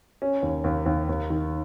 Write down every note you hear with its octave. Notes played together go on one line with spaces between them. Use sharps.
C#4
D#2
D#2
D#2
D#2
D#3